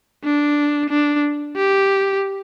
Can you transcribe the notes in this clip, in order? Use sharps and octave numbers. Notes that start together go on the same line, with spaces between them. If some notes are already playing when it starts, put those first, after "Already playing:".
D4
D4
G4